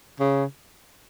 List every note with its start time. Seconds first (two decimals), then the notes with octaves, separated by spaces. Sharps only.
0.20 C#3